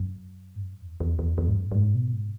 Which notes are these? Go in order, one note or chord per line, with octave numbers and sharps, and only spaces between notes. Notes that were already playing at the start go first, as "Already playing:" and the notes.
Already playing: F#2
G#2
F#2
E2
E2
E2
E2
G#2
F#2
F#2
G#2
B2
G#2